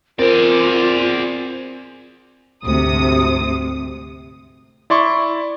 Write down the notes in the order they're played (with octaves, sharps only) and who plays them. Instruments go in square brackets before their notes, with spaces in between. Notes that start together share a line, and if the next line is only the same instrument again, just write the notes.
[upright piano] C4 [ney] F4 [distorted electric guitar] G#4 D5 [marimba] A#4
[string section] D2 G#2 C3 D#6
[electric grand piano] E4 D5 C6 C#6